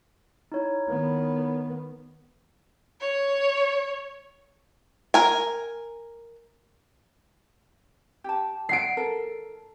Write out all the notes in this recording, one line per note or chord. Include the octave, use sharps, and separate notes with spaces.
D#4 E4 C#5
D#3 B3
C#5
A#4 G#5
G4 A5
E5 F#5 C7 D7
A4 A#4